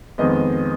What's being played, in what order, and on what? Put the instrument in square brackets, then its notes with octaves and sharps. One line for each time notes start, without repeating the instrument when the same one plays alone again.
[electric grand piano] F2 D#3 G#3 B3 D#5